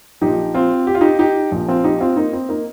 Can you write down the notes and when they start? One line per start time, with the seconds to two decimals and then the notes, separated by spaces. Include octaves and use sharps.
0.21 A#1 A#2 F3 D#4 G4
0.54 C4 F4
0.87 G4
0.95 F4
1.01 D#4 G4
1.19 D#4 G4
1.52 A#1 A#2 F3
1.68 C4 F4
1.84 D#4 G4
2.00 C4 F4
2.17 A#3 D#4
2.33 C4
2.49 A#3 D#4